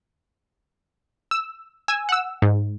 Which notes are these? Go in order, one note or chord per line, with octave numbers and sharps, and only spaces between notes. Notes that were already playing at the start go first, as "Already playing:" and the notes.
E6
G#5 E6
F#5 E6
G#2